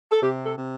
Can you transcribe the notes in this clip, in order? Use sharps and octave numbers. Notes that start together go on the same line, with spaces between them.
A4
C3 G4
A4
C3